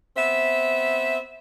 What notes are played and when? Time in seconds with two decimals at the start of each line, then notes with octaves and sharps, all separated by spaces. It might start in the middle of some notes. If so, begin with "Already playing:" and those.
0.17 B3 C4 E5